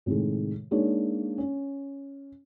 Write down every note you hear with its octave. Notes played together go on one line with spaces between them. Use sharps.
A2 C3 D#3 G#3
G#3 A#3 D4 D#4 C#5
C#4